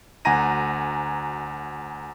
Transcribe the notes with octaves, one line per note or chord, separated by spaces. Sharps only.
D2 F#5 G#5 A#5 A#6 D#7